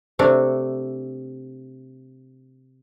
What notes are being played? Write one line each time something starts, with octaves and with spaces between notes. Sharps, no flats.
C3 A3 D4